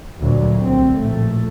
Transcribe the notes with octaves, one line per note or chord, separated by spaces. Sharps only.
D2 A#2 F#3
C2 C4
A#1 A2 A3